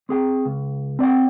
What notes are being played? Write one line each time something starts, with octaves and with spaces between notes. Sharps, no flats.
C4 G#4 G5
C#2
C4 D5 F#5 G5